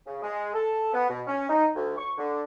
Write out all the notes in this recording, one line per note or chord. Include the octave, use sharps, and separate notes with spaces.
C#3
G#3
A4
B3
B2
C#4
D#4
D2
C#6
D3